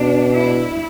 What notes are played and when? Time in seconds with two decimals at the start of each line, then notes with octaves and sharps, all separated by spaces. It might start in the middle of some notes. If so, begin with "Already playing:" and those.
Already playing: B2 D4
0.36 E4